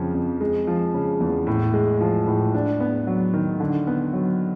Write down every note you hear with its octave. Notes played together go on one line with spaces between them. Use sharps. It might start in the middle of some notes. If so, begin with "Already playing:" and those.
Already playing: F2 C#3 F3
F2
G#3
F3
C#3
E2
A2
G#3
F3
A2
D4
B3
F#3
D#3
D3
B3
F#3